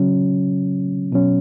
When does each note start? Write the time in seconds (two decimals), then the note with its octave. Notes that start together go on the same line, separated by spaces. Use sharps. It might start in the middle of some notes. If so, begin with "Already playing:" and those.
Already playing: C#3 F#3 C#4
1.12 B2 F#3 C#4